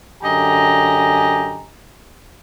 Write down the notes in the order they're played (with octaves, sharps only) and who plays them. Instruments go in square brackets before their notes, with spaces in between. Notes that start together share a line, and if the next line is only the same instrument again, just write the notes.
[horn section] F#2 D3 G4 D#5 G#5 A#5